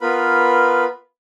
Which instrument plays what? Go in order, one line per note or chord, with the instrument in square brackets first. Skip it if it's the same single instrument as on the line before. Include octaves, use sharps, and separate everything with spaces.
[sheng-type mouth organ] B3 F4 A#4 B4 B5